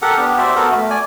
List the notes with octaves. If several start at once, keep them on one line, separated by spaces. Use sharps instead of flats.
G4 A4 A#4 F#5
B3 D4 G4
F#4 C5 D5 E5
B3 F#4 A4 A#4
A3
D5 G#5